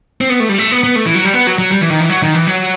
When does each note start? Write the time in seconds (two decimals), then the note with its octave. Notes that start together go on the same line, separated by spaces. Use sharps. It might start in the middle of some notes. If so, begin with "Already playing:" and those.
0.21 C4
0.30 B3
0.40 A3
0.49 G3
0.58 A3
0.71 B3
0.84 B3
0.96 A3
1.05 E3
1.15 F#3
1.24 G3
1.34 B3
1.47 F#3
1.59 F#3
1.71 G3
1.81 E3
1.91 D#3
2.00 E3
2.10 F#3
2.23 D#3
2.35 E3
2.47 F#3